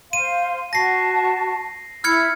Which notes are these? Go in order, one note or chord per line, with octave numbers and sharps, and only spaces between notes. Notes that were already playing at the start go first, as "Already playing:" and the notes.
C5 F5 C6 D#7
F#4 A5 C#6 A#6 C7
E4 B5 E6 F6 G#6 C#7